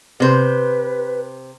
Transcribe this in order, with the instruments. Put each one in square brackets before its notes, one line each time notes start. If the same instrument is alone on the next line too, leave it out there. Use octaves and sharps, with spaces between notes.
[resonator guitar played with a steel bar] C3 C5 [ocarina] B4